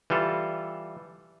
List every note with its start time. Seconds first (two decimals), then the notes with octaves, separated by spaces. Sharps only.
0.10 E3 G3 F4 A4